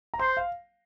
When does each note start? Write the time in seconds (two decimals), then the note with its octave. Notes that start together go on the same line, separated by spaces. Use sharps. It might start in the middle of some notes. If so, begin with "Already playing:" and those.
0.14 A#5
0.19 C5 C6
0.37 F5